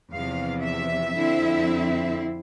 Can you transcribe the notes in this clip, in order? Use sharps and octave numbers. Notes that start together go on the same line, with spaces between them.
E2 C3 F3 F5
E5
F2 D3 F3 C4 E4